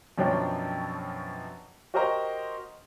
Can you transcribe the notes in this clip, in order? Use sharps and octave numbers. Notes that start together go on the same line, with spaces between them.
F#2 B2 F3 F#3 D4 G5
F#4 G4 A#4 C5 D#5 A#5